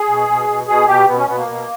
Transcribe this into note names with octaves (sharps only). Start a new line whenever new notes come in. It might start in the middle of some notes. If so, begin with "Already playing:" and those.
Already playing: G#4
B2
B2
B2
B2 G#4
B2 G4
B2 B3
C#4
B2 B3
A#3
B2